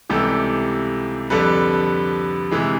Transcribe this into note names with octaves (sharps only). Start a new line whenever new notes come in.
C#2 C3 E3 G3 G4 A4
F2 D3 G3 A4 B4
C3 E3 G#3